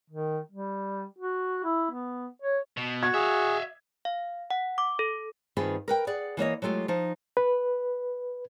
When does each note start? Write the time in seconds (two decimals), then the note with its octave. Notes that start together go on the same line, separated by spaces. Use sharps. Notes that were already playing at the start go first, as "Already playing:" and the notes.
0.10 D#3
0.52 G3
1.19 F#4
1.64 E4
1.91 B3
2.42 C#5
2.77 B2
3.03 F#4 G#6
3.14 G#4 E5 F5
4.05 F5
4.50 F#5
4.78 D6
4.99 A4
5.57 G2 D#3 C4 F4 G#4 B4
5.88 A#4 B4 G5
6.07 G#4 D5 F#5
6.37 E3 A#3 C#5 D#5
6.62 F#3 G#3 A3 F4 G4
6.88 F3 D#4
7.37 B4